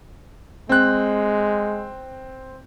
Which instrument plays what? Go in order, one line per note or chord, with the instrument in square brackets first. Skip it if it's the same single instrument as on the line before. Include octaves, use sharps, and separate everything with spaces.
[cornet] G#3 [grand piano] C4 F#6